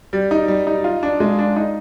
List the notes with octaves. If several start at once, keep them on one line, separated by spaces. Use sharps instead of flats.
G3
D#4
G3
D#4
F4
D4
G#3
D4
D#4